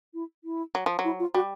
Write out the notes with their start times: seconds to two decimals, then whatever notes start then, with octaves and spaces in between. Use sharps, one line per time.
0.14 E4
0.44 E4
0.75 F#3
0.86 F3
0.99 F#3
1.04 E4
1.19 F4
1.34 G3 F#4